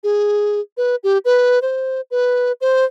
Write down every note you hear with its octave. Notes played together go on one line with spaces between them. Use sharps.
G#4
B4
G4
B4
C5
B4
C5